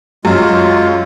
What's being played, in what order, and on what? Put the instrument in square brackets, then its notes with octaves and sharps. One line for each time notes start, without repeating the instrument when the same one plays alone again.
[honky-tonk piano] F#2 [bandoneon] G#3 F4